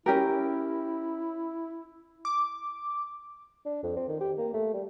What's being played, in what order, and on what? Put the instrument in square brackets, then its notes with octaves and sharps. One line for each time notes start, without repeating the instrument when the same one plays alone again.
[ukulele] C#4 G4 A#4 [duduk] E4
[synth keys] D6
[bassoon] D4
F2
C4
D#3
G4
A#3
A3
G3